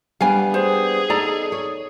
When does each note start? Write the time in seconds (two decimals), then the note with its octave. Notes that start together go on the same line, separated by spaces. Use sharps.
0.21 G3 B3 D4 F5 G#5
0.54 G#4 C5
1.10 D#4 A4 D5 A#5
1.52 C#5